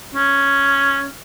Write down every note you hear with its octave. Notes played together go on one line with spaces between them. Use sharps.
C#4